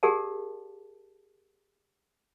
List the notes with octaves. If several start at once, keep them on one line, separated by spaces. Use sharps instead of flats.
G4 G#4 A#4 D5 F#5 A5